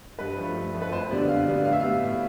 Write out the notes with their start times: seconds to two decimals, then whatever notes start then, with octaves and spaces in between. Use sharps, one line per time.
0.19 G2 B4
0.37 F3 A3
0.56 G2
0.74 F3 A3
0.82 B4
0.92 F2 C5
1.11 D3 G3 B3 D5
1.29 F2 F5
1.48 D3 G3 B3
1.65 A2 F5
1.73 E5
1.80 G3 B3 F5
2.03 A2